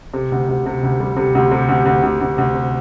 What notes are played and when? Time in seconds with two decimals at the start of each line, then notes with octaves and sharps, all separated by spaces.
0.14 C3
0.32 D2
0.48 D2
0.66 C3
0.83 D2
1.00 G3
1.17 C3
1.35 D2
1.51 C3
1.69 D2
1.86 D2
2.03 D2
2.21 D2
2.38 D2
2.54 C3